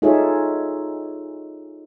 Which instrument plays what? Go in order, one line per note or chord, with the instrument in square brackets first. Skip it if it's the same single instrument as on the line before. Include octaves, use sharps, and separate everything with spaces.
[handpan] D#4 F4 G#4 A4 C#5 E5